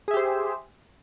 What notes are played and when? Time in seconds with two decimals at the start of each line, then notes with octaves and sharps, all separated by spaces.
0.08 G#4
0.11 E5
0.14 G4
0.17 C5